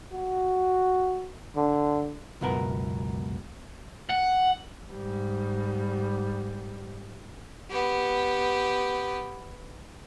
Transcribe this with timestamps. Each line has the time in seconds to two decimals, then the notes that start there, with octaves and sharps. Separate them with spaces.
0.12 F#4
1.55 D3
2.41 C#2 F#2 B2 B3 A#4
4.10 F#5
4.91 G#2 G3
7.70 B3 G4